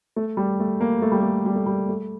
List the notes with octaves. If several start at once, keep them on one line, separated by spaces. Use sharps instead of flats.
A3
G3
A3
A#3
A3
G3
A3
G3
A3
G3
A3